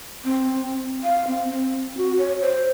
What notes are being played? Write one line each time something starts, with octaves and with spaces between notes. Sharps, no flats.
C4
F5
C4
C4
F#4
C#5
C5